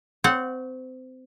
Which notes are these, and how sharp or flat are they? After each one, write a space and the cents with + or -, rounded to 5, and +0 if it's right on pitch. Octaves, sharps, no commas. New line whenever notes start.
C4 -25 C#5 +0 F#5 -10